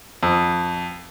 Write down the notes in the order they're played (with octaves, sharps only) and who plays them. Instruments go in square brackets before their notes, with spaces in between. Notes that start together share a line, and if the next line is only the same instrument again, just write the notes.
[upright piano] F2